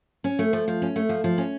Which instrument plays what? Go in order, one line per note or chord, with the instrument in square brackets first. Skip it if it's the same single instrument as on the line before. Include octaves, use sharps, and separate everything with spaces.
[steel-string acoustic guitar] C#4
A3
F3
F3
C#4
A3
F3
F3
C#4